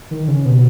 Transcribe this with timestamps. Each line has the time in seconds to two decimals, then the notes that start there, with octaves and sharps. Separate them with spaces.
0.11 D#3
0.28 C#3
0.45 B2